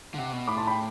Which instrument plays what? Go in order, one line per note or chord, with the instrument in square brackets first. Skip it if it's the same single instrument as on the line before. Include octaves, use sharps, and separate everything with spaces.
[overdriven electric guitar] D3
[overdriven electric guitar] C3 [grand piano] F#5
[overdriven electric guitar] B2
[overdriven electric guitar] A2 [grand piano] B5 D6
[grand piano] A5 C6
G5 B5